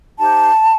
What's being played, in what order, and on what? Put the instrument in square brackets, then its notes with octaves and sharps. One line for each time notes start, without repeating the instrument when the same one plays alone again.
[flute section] D#4 G4 C5 A5